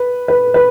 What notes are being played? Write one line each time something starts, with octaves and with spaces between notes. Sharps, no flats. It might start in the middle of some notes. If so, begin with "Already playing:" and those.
Already playing: B4
B4
B4